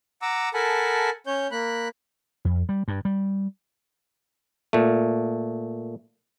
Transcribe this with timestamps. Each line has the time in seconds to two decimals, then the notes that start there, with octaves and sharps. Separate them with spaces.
0.22 F#5 A#5 D6 E6
0.54 A4 A#4 F#5 G#5 A5 B5
1.27 C#4 C#5 G6
1.51 A#3 B5 F#6
2.45 F2
2.69 G3
2.88 G2
3.05 G3
4.73 A#2 A3